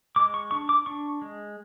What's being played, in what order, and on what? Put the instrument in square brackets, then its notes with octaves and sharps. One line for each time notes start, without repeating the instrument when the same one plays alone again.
[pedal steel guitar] G#3 D6
C#6
D4 C#6
D6
D4 C#6
G#3